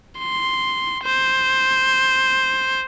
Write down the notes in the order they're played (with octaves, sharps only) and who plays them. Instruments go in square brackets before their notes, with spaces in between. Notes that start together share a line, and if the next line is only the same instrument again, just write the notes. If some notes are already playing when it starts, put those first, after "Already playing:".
[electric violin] C6
C5